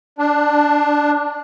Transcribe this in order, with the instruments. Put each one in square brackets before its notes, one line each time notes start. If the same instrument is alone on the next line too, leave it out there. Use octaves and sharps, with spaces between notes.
[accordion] D4